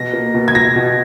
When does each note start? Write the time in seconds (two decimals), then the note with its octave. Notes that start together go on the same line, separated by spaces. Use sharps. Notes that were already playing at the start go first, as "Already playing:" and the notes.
Already playing: B2 A#6
0.13 A#3
0.34 B2
0.48 G#6
0.55 B2 A#6
0.76 B2